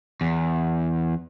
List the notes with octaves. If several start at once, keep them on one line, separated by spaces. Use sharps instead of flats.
E2